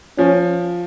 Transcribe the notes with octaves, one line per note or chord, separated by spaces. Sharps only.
F3 C#4